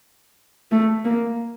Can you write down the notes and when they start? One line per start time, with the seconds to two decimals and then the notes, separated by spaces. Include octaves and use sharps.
0.72 A3
1.05 A#3